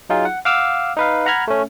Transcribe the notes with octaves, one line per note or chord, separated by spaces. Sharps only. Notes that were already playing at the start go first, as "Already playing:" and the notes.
F#3 D#4 F4 G#4
F#5
F5 F#5 D6 E6 F6
D#4 B4 F5
F#5 A#5 B5 F6 G#6
A3 C#4